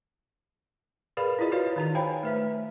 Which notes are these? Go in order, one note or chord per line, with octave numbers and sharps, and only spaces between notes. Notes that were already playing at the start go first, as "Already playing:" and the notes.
G#4 A#4 B4 D5 F5 B5
E4 F4 G#4 D5 D#5
F#4 B4 C#5 D5 F5
D#3 D#4 A#5
C5 C#5 F5 G5 G#5 B5
A3 B4 E5